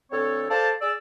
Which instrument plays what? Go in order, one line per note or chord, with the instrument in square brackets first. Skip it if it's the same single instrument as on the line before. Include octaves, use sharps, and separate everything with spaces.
[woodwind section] D2 C4 A4 C#5
A4 C5 D5 F5 A5
G#4 D5 E6